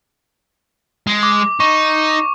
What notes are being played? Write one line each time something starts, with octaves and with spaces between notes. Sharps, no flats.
G#3
D6
D#4 C#6